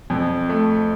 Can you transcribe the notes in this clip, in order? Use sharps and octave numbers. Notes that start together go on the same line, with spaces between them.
F2
A3